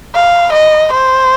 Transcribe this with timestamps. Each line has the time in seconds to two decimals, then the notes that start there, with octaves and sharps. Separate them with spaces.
0.15 F5
0.53 D#5
0.93 C5